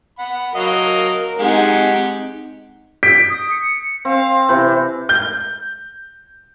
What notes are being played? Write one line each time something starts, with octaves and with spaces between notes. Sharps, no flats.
F#5 B5
F#3 A#4 D#5 F5
G#3 C4 D#4 G4 G#4 F#5
G6 B6 D7
D#6
C#7
C4 F5
C3 E3 G6
G6